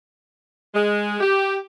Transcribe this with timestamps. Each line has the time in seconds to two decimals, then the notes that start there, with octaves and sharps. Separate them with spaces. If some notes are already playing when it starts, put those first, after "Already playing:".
0.74 G#3
1.21 G4